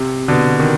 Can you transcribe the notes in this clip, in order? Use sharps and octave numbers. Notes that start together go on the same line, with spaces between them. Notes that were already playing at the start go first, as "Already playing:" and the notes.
Already playing: C3
B2 D3
D#3